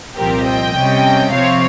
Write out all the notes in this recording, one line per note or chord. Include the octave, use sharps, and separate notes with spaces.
C2 A#2 F3 C4 G4 A#4
D#5 G5
C3 G3 C#4
C3 F3 C4 C#5 F5